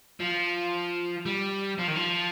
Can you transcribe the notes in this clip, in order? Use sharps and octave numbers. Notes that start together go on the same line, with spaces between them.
F3
G3
F3
D#3
F3